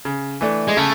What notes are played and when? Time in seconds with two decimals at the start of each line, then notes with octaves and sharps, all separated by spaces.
0.05 C#3
0.41 E3 A3 D4
0.67 G#3
0.77 C#3 A3